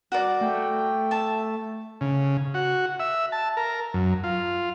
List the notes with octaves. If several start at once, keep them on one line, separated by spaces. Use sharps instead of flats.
G3 F#4 A#4 D5
A3 G5
E5 A5
C#3
F#4
E5
A5
A#4
F#2
F4